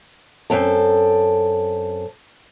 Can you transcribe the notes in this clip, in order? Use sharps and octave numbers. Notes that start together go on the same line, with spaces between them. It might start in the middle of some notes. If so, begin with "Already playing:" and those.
F#2 C4 A4